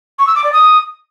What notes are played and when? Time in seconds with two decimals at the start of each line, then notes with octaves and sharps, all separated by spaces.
0.19 C#6
0.27 E6
0.36 D6
0.44 D5
0.53 D#6